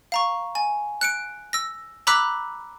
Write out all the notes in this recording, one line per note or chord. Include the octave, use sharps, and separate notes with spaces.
F5 A#5 C#6
G#5
F#6 C#7 D7
E6 A#6
A#5 B5 D6 E6 F#6 B6